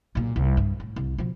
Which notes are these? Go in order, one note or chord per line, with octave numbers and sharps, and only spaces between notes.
B1 A#2
C2
G2
A2
C2
B2 F3